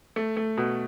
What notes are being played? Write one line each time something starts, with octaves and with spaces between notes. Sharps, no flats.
A3
A3
B2